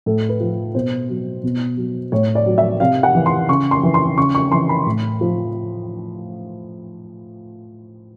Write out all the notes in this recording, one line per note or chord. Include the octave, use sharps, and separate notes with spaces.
A2 A4
B4
F3
B2 C5
F#3
B2
F#3
A2 C#5
D5
F#3
E5
C3 F5
F#5
E3
C6
C#3 C#6
C6
E3
C6
C#3 C#6
C#6
E3 C6
B5
A2
F3